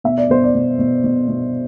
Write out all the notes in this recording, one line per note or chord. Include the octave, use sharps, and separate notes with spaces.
B2 E5
D5
B2 C5
D5
B2
B2
B2
B2